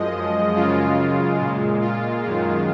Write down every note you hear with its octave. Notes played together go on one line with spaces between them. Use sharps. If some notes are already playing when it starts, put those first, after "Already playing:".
Already playing: F#2 F3 G#3 D#5
F#2 C#3 G#3 F4
A#2 G#3
F4
F#2 D#3 G#3